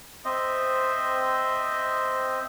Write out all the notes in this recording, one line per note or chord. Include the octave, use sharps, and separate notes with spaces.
C4 C5 D#5 E5